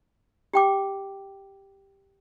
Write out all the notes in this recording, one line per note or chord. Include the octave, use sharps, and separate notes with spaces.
G4 G5 D6